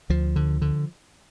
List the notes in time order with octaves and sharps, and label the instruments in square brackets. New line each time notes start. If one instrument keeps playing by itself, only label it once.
[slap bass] D2 F3
D3
D3